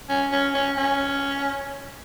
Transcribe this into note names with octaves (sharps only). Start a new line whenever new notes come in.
C#4
C#4
C#4
C#4